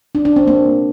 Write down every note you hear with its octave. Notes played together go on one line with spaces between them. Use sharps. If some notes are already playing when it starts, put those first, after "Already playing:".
D4
D4
C4
A#3